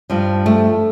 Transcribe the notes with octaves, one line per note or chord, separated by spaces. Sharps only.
G2 F3
A3